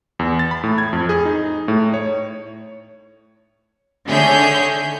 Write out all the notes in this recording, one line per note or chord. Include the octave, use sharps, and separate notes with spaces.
E2
A6
B5
A2
G#6
F2
G#4
D#4
A2
C#5
D3 D#3 G#4 C#5 E5 G6